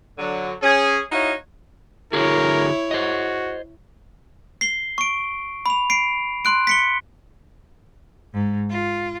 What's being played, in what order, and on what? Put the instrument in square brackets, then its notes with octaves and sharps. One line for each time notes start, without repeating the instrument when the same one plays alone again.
[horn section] D3 F#3
C#4 G#4
D#4 E4 F#4 C#5 D#5 F5
[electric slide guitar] D3 F#4 G#4 [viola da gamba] E4 C#5 [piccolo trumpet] A#4
[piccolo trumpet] F#4 [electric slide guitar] C5 D#5
[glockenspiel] C7 G7
C#6 D7
B5 F7
C7 D7
C6 F#6 D7
B6 C#7 G7
[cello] G#2
F4